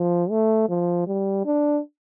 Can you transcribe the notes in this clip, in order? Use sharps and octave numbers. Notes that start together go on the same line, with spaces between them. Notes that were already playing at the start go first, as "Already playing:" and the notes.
Already playing: F3
A3
F3
G3
D4